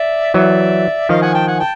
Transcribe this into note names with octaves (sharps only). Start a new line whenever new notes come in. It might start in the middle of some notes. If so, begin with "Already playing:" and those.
Already playing: D5 E5
E3 F#3 D5 E5
D#3 F3 D#5 F5
F#5 G#5
G5 A5
F#5 G#5
G5 A5